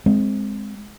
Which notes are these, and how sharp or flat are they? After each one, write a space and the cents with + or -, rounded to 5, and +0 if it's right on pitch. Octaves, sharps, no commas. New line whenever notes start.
G#3 +0 C4 +0